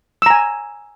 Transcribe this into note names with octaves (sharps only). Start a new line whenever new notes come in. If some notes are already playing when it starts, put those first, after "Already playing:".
G#5 A#5 E6